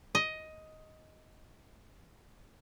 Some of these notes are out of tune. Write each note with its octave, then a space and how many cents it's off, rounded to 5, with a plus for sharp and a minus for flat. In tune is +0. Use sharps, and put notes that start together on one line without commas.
D#5 +10